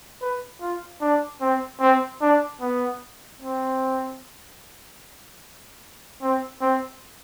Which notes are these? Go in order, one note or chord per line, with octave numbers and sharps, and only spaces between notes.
B4
F4
D4
C4
C4
D4
B3
C4
C4
C4